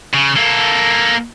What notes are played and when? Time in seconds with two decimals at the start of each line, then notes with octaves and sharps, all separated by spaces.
0.14 C#3
0.37 A#3 A4